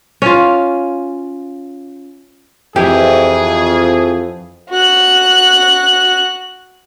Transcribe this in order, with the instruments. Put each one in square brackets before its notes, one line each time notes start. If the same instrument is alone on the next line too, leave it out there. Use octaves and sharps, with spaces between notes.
[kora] C#4 F4
[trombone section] F2 [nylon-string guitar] E3 [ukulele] G4 [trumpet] G#4
[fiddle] F#4 F#6